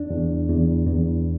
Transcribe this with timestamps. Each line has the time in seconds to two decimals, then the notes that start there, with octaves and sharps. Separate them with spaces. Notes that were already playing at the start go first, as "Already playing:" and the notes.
Already playing: E2 D4
0.11 E2
0.49 E2
0.87 E2